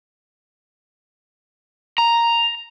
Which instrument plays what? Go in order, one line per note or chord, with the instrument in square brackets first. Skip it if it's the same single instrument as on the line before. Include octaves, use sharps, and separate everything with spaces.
[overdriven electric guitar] A#5